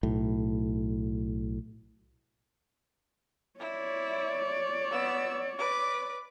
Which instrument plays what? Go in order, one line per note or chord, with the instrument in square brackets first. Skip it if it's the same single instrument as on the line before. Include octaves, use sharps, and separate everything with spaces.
[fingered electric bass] B1 A2
[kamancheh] E4 [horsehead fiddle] C#5 D5
[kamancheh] B3 E6
B4 D6